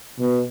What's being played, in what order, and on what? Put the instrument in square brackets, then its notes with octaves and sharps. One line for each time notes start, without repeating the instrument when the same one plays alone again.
[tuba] B2